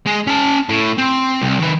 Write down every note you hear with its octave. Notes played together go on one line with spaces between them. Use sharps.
G#3
C#4 A5
A2
C4
C2
D#3 B4